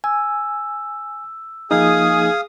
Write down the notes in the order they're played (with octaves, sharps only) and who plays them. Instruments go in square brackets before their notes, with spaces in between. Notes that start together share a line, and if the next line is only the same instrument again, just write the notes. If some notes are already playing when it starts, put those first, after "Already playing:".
[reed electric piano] G#5 [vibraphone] E6
[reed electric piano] F3 A#3 D#4 [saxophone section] G#4 [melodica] F5 D#6